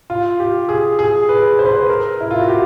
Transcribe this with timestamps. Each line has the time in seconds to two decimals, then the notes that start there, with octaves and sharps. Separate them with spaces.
0.10 F4
0.40 G4
0.69 G#4
0.99 G#4
1.29 B4
1.59 C5
1.65 B4
1.73 C5
1.89 A#4
2.20 E4
2.31 F4
2.39 F#4
2.48 G4